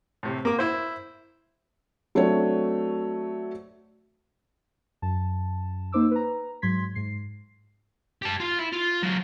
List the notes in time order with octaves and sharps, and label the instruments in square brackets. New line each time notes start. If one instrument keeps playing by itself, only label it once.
[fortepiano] A2 C3
A#3 A#4 D6
E4 C5
[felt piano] F#3 A3 C4 D4 C#5
[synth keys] F#2 A5
A#3 D#4 C5 D6 E6
B4 A#5
G#2 F#3 C6 G#6 B6
G#2 C7
[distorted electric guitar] G4 A5
F4
E4
F4
F#3 F4